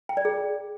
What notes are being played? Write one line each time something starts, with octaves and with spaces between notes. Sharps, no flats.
G5
D5
G#4